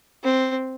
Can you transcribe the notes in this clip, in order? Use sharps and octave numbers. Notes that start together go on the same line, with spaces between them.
C4